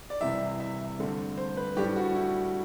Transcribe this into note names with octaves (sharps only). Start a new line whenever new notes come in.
D5
C2 C3 E3 E5
E5
G2 D3 A3 C4
C5
B4
A2 G3 D4 G4
F#4
E4